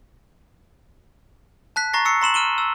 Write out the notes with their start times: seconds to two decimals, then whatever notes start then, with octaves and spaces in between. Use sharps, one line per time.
1.76 A5 F#6 B6
1.93 A#5 C#6 A6 A#6 C7
2.05 C#6 E6 C7 C#7
2.21 A#5 C6 E7 F#7
2.34 F6 D#7 E7 G7
2.58 E6